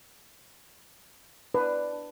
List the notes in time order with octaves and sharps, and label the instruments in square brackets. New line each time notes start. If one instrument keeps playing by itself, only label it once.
[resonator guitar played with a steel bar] D4 [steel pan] B4